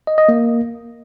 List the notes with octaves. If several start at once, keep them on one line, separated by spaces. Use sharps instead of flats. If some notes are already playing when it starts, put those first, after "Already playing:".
D#5
D#5
A#3